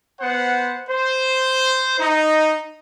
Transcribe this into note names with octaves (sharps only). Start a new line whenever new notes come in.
B3 C5 F#5
C5
D#4